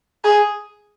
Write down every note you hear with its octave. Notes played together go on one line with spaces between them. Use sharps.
G#4